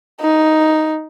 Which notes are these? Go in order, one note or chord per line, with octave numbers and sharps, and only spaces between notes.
D#4